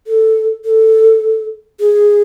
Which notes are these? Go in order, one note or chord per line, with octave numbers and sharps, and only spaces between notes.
A4
A4
G#4